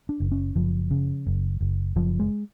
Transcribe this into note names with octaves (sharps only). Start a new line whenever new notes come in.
D4
F#1
C#4
F#1 F3
C#3
F#1
F#1
F#1 F3
G#3